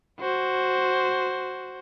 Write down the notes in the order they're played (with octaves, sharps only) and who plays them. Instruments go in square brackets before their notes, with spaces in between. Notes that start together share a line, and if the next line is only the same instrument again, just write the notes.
[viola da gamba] F#4 C5